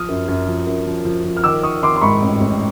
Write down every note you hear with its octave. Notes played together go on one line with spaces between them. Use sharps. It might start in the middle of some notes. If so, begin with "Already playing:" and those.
Already playing: F3 D#6 F6
F#2
F#2
F3
F#2
F3
F3
F3
F6
D#3 D6 E6
D#3 C#6 D#6
D#3 C6 D6
C6
G#2 B5 C#6
A1
A1